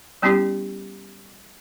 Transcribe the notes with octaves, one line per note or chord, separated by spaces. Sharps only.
G3 B3 C#4 E4 G4